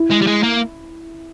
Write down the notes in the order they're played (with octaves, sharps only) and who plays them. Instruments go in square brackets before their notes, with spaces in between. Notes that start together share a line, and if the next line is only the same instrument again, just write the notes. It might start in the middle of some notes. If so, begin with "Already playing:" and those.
Already playing: [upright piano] E4
[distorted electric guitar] G#3
G3
G#3
A#3